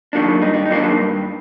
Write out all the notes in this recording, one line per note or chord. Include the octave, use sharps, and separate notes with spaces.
D#3 F#3 A#3 D4
G2 D#4
D4
D#4
D#3 F#3 A#3 D4
G2